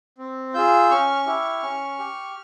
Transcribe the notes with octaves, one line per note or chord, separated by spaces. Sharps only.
C4
F4 G#4 E6 G6
C#4 C#6 F6
E4 G4
C#4
G4